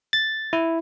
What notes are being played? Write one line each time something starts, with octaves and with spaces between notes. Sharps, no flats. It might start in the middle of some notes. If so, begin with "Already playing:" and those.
A6
E4